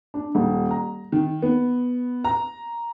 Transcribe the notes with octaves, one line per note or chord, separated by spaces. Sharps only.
D4
D#1
A#5
D#3
B3
A#5